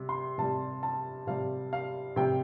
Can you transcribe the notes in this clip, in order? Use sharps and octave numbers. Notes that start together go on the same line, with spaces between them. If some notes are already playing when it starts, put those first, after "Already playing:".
Already playing: C3 G3
C6
C3 G3 A5
A5
C3 G3 F5
F5
C3 G3 G5